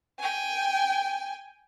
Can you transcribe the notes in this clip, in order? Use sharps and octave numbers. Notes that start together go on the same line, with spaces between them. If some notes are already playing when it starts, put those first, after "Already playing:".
G5 G#5